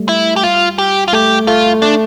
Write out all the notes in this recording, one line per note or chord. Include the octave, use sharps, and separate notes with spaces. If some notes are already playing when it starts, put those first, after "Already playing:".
Already playing: G3 A3
E4
G4
F4
G4
F4
A3 G4
A3 F4
A3 D4